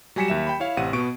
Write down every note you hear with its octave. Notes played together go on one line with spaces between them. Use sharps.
F#3 G3 G#5 B6 C#7 E7
D#2 E5 E7
G5 B5
E4 C#5 F5
A1 C3 F#5 D#7
B2 B3 C#6 D7